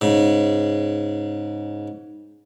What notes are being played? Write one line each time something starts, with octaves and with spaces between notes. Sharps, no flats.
G#2 C#3